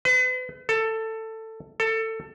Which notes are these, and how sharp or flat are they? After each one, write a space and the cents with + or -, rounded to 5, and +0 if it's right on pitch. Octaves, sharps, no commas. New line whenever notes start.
B4 +40
A4 +15
A4 +20